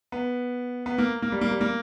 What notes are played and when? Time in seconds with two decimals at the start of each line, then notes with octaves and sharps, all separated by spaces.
0.12 B3
0.86 B3
0.98 A#3
1.22 A#3
1.32 G3
1.41 A#3
1.51 G3
1.61 A#3